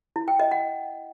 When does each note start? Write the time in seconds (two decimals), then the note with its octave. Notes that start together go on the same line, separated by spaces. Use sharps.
0.16 E4
0.28 G5
0.40 D#5
0.51 F#5